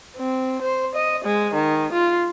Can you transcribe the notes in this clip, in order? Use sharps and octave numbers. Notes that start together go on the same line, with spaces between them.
C4
C5
D#5
G#3
D#3
F4